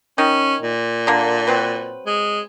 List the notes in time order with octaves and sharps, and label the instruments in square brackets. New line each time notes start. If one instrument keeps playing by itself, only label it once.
[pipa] D#3 [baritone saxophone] C#4
[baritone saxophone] A#2
[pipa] D3 A#3
F#3 C4 B4
[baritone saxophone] G#3